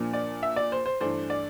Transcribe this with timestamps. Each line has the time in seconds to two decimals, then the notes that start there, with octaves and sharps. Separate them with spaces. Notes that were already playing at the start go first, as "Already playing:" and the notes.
Already playing: A#2 F3 A#3 D4
0.13 D5
0.43 E5
0.56 D5
0.72 C5
0.86 C5
1.01 G2 E3 A3 D4 C5
1.30 D5